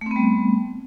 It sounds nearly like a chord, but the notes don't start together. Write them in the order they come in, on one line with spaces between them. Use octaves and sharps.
A3 C4 B3 G3